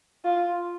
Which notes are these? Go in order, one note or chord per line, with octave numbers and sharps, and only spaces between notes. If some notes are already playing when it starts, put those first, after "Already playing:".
F4